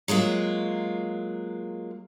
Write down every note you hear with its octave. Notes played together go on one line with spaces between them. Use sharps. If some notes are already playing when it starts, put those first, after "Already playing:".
F#3 G#3 A#3 F4